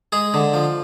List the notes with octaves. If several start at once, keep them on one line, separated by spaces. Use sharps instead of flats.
G#3 G#4
D3
F3